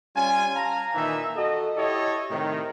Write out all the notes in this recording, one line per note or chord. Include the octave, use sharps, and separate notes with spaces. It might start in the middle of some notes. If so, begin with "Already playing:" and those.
G3 C#4 F4 G#5
F5 A5 A#5
A#2 D#3 E3 D#4 E5
F#4 A4 D#5
E4 G4 A4 C#5 D#5
A2 C3 D#3